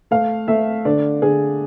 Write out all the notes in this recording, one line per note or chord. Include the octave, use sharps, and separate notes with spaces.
A3 F5
A3 E5
D3 D5
D3 G#4